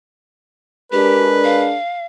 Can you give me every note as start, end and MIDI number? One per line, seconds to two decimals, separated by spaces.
0.92 1.76 56
0.92 1.76 62
0.92 1.27 67
0.92 1.76 70
0.92 1.66 71
1.44 2.06 77